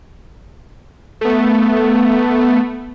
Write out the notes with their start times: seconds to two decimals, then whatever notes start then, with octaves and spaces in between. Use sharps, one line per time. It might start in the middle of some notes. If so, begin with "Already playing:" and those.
1.21 A3 B3